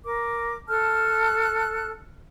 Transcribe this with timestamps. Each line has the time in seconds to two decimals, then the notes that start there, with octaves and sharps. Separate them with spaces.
0.04 A#4 D6
0.68 A4 A5 F6 F#6